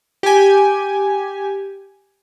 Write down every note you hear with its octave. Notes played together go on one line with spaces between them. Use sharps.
G4 G#5